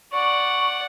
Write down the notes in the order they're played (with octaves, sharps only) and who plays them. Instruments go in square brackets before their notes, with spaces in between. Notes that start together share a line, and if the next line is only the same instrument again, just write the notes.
[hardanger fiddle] D5 F#5 [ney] C#6